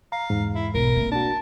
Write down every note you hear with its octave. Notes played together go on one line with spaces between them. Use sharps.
F5 A#5
E2 G#2
E4
B1 A#4
A#3 C4
D4 F#4 A5